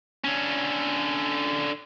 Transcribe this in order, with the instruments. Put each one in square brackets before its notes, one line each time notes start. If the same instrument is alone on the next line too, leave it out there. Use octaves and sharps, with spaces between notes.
[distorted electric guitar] D3 C#4